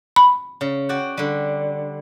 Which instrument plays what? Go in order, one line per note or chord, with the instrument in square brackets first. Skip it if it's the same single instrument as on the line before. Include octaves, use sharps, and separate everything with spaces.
[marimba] B5
[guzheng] C#3
F#4 D5 G5
D3 G3